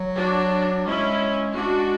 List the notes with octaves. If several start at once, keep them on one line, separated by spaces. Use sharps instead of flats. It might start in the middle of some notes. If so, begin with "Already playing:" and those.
Already playing: F#3
D4 F#4
G#3 C#4 E4
G#3 D4 F#4